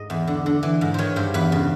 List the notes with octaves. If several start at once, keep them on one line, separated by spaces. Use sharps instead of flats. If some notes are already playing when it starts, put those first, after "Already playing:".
Already playing: G#2 D#5
E2
D3
D3
E3
G#2
D#3 C5 C#5
G2 C5
E2 B4
C#3